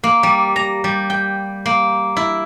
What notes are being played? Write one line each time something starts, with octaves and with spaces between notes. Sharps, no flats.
A#3
G3
A#5
G3
G5
A#3
E4